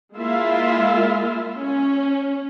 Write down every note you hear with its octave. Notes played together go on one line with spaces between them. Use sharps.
G#3 A#3 E4 F4 E5
C#4